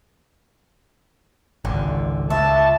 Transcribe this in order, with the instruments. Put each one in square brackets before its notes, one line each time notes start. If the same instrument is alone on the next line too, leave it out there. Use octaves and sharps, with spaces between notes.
[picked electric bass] G#1 C#2 [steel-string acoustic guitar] D3
[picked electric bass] C#2 [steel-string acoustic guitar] E5 [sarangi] A5